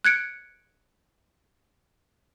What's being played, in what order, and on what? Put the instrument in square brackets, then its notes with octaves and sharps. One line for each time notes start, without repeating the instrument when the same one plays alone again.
[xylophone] F#6 G#6 C#7 D7